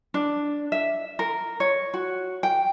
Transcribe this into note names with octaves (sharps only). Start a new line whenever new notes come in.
D4
E5
A#4
C#5
F#4
G5